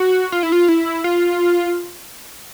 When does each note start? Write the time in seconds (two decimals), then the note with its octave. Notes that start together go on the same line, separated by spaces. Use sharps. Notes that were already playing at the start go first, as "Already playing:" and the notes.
Already playing: F#4
0.32 F4
0.43 E4
0.52 F4
0.68 E4
1.04 F4